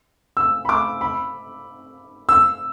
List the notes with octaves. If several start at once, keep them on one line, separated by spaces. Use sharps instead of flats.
E6
B5
D6
B5
E6